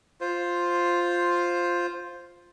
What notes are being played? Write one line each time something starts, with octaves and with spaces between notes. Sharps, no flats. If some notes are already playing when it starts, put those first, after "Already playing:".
F4 C5